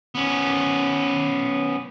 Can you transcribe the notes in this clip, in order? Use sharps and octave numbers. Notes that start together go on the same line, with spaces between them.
B3 C#4